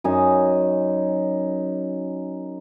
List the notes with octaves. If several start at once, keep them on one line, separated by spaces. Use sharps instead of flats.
F#2 D#4 G#5